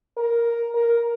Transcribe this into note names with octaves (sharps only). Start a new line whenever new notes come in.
A#4
A#4